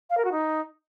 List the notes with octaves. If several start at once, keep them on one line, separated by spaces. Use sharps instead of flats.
F5
A#4
F#4
D#4